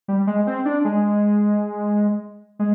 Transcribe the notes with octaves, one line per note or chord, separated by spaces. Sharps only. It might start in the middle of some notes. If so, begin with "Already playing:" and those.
G3
G#3
C4
D4
G#3
G#3